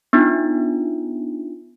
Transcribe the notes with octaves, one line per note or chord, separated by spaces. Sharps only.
B3 D4 D#4 F4